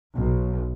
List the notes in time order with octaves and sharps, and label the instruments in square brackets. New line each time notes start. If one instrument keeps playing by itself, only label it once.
[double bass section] B1